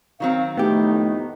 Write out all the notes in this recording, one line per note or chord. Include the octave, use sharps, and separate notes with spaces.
D#3 F#3 C4 F5
F2 A2 A3 B3 D#4 G4